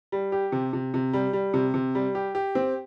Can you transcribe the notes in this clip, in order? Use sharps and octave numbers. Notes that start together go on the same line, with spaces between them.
G3
G4
C3
C3
C3
G3
G3
C3
C3
G3
G4
G4
C4